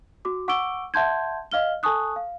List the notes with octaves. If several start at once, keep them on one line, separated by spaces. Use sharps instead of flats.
F#4 D6
F#5 C#6 D6 E6 D7 G7
E5 F#5 A5 C6 G6 G#6
D#5 F5 F6 G7
A4 G#5 A5 C#6 D#6 F#6
F5